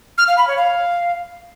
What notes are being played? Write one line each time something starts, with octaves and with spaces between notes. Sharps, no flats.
F6
F5
B5
C#5
F5